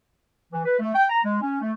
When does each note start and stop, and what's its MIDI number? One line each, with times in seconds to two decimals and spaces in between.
0.52 0.62 52
0.65 0.74 71
0.79 0.92 57
0.95 1.04 79
1.09 1.23 82
1.23 1.37 56
1.41 1.60 61
1.60 1.72 57